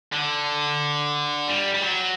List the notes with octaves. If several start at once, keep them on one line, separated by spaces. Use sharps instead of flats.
D3
G3
G3
F#3